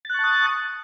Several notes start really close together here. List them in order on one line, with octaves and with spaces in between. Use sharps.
A6 F#6 C#6 A5 D#6